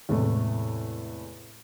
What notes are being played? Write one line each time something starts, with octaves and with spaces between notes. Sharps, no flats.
E2 A2 C3 G#3 A3